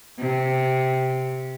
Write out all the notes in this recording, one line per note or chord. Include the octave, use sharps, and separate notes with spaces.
C3